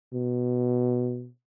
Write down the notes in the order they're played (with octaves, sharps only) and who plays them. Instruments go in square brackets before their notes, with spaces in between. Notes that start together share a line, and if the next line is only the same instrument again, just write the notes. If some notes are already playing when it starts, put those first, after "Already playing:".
[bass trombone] B2